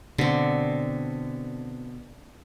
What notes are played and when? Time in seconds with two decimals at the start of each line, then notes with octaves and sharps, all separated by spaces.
0.18 B2 D3 C4